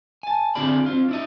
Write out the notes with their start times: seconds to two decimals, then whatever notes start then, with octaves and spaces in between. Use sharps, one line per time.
0.23 G#5 A5
0.55 D3 C4 F4 G#4 D5 B5
0.86 C4 F4
1.09 D4 E4 D#5